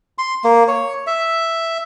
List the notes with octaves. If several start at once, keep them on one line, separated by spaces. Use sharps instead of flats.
C6
A#3
C#5
E5